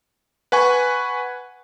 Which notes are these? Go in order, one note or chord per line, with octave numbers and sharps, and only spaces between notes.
B4 F#5 G#5 C#6